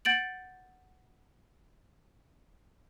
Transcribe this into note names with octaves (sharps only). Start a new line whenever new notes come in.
F#5 G6 A6 D7 F#7